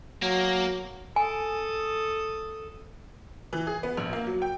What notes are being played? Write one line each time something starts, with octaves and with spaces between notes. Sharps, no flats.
F#3 A#3
A4 G#5 D#6
E3
G#4
B3
A#1
A#3
F#3
G5